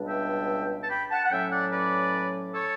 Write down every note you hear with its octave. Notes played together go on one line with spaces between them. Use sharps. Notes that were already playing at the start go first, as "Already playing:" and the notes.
Already playing: C#2 B2 G3 D4
E5 G5
A5
G5 B5
F#5 A5
F#5
A2 F#3 C#4 E5 G5
D5 F#5
B4 D5
A4 C#5